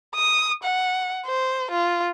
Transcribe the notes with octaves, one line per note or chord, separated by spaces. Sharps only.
D#6
F#5
C5
F4